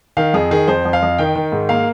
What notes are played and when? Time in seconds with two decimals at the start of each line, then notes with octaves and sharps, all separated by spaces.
0.17 D#3 F5
0.34 F2 G#4
0.51 D#3 G#4
0.67 F2 C5
0.85 F2
0.93 F5
1.02 F2
1.19 D#3 G5
1.36 D#3
1.52 G#2
1.69 A#3 F5